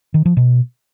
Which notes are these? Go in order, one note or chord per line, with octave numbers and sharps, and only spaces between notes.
D#3
F3
B2